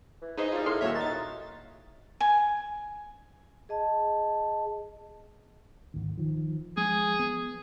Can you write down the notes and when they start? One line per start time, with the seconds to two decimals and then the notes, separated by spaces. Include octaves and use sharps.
0.22 E3
0.38 D#4 G#4 B4 C5 D#5
0.52 G3 F4
0.66 A2 A#3 E4 C6 F6
0.81 D#1 A#2 A3 F#4 C#5 E5
0.95 D#4 E5 F#6 A6
2.20 G#5
3.69 G#4 D#5 A5
5.94 D#1 G#1 D2
6.18 D#3 F3
6.77 F3 G#3 G#4
7.19 B3